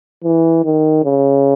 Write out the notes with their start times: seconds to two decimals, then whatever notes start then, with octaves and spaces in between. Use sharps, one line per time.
0.24 E3
0.64 D#3
1.04 C#3